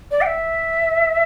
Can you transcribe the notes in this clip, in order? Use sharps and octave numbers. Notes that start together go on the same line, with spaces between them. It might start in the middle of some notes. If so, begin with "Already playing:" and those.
D5
G5
E5